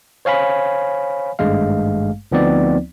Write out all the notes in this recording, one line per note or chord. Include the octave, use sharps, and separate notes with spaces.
C5 C#5 F5 G#5 B5
G#1 G2 G#3 A3 F5
D2 F3 B3 C4 D#4 D5